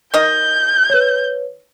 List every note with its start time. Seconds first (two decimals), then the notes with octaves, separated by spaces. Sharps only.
0.14 D#3 D#5 G6
0.90 B4 C#5